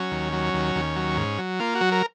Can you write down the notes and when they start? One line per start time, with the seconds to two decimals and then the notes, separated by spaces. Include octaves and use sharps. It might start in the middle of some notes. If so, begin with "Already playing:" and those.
Already playing: F#3 C#4
0.11 D#2
0.33 F#3
0.54 D#2
0.76 D#2
0.96 F#3
1.17 G#2
1.38 F#3
1.60 A#3 F4
1.75 F#4
1.81 F#3
1.92 A#4